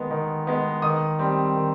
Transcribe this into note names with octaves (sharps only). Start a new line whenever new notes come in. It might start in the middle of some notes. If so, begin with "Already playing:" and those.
Already playing: D#3 G#3 B3
D#3
G#3 B3
D#3 D#6
G3 C4
D#3